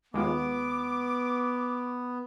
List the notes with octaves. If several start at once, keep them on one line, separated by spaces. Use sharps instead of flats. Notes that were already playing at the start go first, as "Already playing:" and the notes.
D#2 G#3 B3 F4 D6